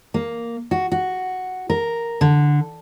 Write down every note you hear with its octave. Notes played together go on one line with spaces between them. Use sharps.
A#3
F#4
F#4
A#4
D3